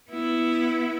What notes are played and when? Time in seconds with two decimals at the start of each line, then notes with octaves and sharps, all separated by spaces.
0.10 B3 E4